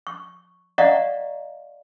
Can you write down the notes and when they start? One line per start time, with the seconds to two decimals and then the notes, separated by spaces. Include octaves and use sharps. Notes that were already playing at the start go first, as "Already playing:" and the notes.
0.07 C#6
0.78 D5 D#5 F5 F#5 A#5 C#6